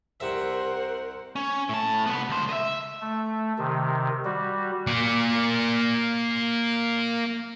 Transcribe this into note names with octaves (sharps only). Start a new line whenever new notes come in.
C2 A#4 C5 E5 F#5
C#4
A2 A5
C2 B3
C#2 C5
D#5 E5
A3
C3 D#3
G3 F#4
A#3 D5